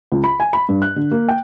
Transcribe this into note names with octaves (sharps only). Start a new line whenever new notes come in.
C#2
B5
G#5
B5
G2
F#6
D3
A#3
G5